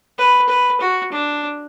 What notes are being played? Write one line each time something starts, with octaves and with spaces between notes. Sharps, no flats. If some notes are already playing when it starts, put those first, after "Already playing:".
B4
B4
F#4
D4